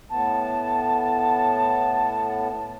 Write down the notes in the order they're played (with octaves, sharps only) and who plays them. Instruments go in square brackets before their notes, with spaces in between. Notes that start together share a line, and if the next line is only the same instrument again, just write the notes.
[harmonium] A2 B3 [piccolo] A5